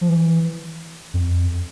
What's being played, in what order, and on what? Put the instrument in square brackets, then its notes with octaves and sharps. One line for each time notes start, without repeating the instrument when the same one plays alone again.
[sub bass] F3
E3
F2